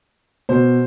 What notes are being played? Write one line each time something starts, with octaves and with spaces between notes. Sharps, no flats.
B2 C5